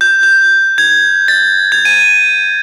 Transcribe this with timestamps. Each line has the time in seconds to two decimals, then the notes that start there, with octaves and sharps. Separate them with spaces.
0.01 G6
0.23 G6
0.78 G#6
1.28 A6
1.72 G#6
1.85 D#7